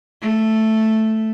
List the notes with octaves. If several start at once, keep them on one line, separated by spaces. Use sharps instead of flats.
A3